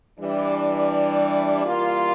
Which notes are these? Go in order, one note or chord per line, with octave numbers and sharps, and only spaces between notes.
E3 G3 D4
E3 G3 A#3 F4